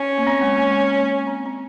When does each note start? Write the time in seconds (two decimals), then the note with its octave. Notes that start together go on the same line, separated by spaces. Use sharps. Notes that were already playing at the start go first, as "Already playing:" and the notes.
Already playing: C#4
0.18 A#3
0.27 C4
0.41 G#3
0.56 A#3
0.70 G#3
0.99 A#3
1.27 C4
1.46 C4